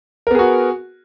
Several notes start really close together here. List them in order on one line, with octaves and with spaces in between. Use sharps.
A#4 B3 G#4 F#4